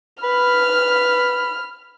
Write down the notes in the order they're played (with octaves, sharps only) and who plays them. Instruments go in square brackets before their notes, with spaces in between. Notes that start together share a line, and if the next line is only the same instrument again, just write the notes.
[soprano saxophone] B4 [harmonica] B5 [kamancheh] F6